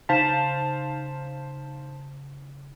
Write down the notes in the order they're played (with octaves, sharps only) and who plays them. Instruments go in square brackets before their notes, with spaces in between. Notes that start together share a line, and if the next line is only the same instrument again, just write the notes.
[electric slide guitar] C#3 D#4 [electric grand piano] C5 F5 A5 [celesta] B6 E7